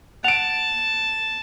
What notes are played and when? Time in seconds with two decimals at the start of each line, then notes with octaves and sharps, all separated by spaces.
0.24 F#5 A5 D7 F7